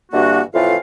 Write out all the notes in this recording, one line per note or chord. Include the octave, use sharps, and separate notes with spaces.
G2 D3 E3 A#3 F#4
F2 A2 E3 F4 F5